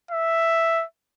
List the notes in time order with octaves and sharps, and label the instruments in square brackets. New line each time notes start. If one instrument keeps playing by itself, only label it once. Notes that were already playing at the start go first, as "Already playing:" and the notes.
[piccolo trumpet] E5